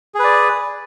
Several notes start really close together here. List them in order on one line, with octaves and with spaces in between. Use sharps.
G#4 B4 D5